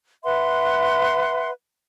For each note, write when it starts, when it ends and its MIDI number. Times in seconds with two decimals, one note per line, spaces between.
0.23 1.50 71
0.23 1.50 76
0.23 1.50 78
0.23 1.50 84